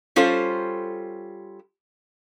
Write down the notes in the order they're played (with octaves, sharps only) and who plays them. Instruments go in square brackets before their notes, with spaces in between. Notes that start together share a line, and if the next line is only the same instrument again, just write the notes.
[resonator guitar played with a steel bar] G3 C#4 F4 A4 C5